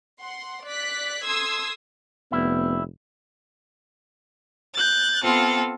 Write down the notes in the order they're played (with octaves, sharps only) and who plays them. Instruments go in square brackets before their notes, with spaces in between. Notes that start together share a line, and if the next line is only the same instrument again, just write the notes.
[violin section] F#5 C6
D5 F#6 B6
A4 C6 D#6 E6 G#6
[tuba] F1 [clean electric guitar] G3 E4 [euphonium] B3
[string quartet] F#6 G6 A6
B3 C4 F4 A4